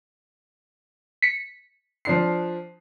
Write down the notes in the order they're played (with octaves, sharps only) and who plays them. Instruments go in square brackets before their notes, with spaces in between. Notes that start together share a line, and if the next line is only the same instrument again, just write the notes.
[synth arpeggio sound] B6 C#7
[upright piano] F3 D4 C7